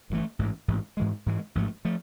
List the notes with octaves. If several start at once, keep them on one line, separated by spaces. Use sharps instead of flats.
G1 G2 E3 A3
A1 G#2 E3
A1 G#2 E3
G#2 E3 G#3
G#2 E3 G#3
A1 G#2 F3 A3
F3 A3